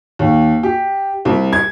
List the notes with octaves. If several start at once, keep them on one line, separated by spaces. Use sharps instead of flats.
D#2
G4
C2
G#6